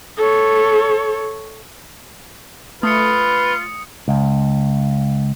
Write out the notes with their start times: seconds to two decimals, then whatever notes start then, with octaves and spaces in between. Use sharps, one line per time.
0.17 A4 C#5
2.83 A3 F4 B4 D#6 C#7
4.08 C#2